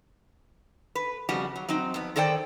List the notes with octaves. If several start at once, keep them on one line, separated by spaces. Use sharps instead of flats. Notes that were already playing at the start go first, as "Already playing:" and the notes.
B4
F2 C#3 G3 F#4
F#3
F#3 C4 D#4
F2 B3
D#3 A4 C5 D5 G5